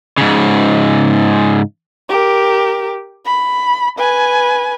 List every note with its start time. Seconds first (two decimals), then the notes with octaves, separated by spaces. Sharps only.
0.18 G#2 C#3
2.09 G4 A#4
3.26 B5
3.99 B4 G#5